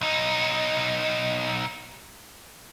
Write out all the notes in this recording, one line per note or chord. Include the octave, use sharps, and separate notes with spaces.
B1 D#4